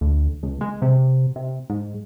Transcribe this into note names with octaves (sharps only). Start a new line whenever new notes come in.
D2
C#2
G#3
C3
C3
G#2